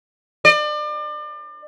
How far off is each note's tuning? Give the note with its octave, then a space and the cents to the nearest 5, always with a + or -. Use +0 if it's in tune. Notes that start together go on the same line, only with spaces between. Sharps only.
D5 +35